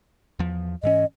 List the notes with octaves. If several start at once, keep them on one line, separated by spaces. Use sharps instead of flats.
E2 F3
G#2 E3 C#4 D#5